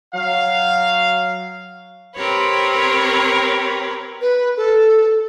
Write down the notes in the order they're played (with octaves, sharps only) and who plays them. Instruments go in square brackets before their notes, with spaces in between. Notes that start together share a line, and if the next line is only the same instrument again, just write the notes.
[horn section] F#3 F5
[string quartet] C4 G4 A#4 B4 C#5
[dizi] B4
A4